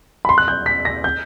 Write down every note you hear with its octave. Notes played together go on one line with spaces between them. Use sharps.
B5
C6
F#6
G6
B6
A#6
G6